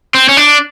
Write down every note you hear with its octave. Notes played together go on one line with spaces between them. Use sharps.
C4
C#4
D4